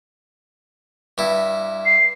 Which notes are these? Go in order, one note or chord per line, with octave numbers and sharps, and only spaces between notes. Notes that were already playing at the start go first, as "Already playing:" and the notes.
G2 E4
C7